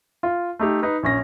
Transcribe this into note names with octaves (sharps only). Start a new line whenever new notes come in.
F4
A3 D#4 G4
D#4 B4
A#1 C#4 A#6